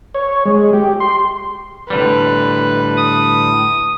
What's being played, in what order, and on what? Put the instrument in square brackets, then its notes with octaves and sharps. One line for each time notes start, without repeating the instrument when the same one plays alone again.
[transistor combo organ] C#5
G#3
G4
C6
[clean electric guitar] A2 D3 G3 [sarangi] B4
[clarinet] D#6